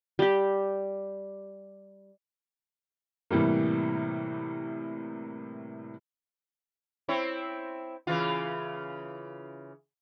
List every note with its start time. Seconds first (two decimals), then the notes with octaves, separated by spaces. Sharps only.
0.19 G3 G4
3.31 A2 C3 E3 G3 A#3
7.09 C4 E4 C#5
8.07 C#3 E3 F4